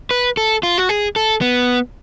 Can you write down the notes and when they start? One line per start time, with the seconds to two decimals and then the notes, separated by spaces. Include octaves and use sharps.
0.11 B4
0.37 A4
0.63 F4
0.78 F#4
0.89 G#4
1.16 A4
1.41 B3